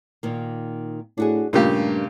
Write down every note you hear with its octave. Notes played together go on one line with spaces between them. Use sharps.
A#2 D#3 A#3
A2 D4 F#4 G#4
G2 A#2 C#3 A3 G4 A#4